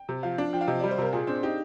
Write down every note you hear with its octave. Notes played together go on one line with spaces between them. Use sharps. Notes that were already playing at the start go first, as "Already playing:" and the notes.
Already playing: G5
C3
F3 F5
D4
F3 G5
F5
C3 D#5
G3 D5
C5
C3 A#4
A#2 G#4
C4 D4
D#4 G4